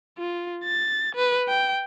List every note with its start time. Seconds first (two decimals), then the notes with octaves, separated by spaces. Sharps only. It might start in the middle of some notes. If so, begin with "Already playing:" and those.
0.18 F4
0.64 A6
1.16 B4
1.48 G5